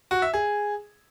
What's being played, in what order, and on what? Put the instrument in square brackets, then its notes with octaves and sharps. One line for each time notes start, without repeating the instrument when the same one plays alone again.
[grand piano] F#4
E5
G#4